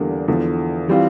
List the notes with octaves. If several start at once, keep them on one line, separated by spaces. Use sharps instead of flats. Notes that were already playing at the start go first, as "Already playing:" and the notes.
Already playing: E2 D3 G3 A#3 D4
E2 D3 F3
E3 G3 C4 F4